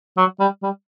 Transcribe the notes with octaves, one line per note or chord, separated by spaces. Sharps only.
F#3
G3
G3